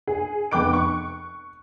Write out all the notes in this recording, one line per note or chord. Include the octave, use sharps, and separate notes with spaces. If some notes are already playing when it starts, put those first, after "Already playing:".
G#4
F1 B3 G5 D6 F#6 D7
C#6